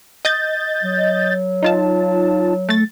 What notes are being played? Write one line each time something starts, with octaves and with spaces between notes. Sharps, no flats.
D#5 G6 A6
F#3
D#4 F4 A5
A3 A6